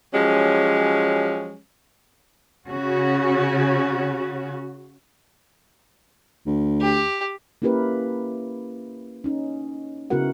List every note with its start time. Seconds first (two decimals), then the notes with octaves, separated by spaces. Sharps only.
0.14 F3 F#3 G#3 C#4 G4
2.67 C#3 C#4 F#4
6.46 D2
6.81 G4
7.62 A#3 C#4 E4 G4 A#4 B4
9.24 C#4 D#4
10.10 C#3 B3 E4 F#4 A#4 F#5